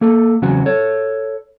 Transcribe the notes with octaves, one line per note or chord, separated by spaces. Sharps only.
A#3 A4
E2 C#3 F#3 C4 F#4 F#5
A4 C#5